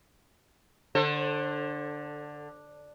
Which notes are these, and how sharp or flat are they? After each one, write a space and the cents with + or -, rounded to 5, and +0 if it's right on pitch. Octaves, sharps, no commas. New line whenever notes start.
D3 +5 A4 +20 C5 +40